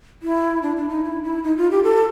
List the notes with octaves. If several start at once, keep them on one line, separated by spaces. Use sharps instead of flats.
E4
D4
D4
D#4
E4
E4
D#4
F4
G4
A4